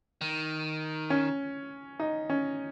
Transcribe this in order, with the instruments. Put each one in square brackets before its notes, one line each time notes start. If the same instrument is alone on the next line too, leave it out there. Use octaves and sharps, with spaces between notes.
[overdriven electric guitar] D#3
[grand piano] C#4
D#4
C#4